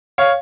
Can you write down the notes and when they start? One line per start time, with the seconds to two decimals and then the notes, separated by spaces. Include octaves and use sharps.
0.18 C#5 F5